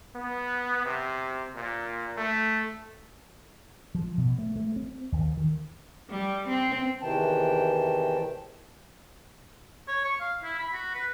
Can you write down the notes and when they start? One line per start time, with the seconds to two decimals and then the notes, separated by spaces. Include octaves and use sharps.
0.15 B3
0.86 C3
1.56 A#2
2.17 A3
3.95 F3
4.18 B2
4.38 A3
4.56 A3
4.76 C4
5.12 D#2
5.37 D#3
6.10 G3
6.48 C4
7.02 E2 C3 D#3 E3 G5 A5
9.88 C#5
10.04 C#6
10.21 F5
10.43 E4
10.59 B5
10.73 F#4
10.95 B4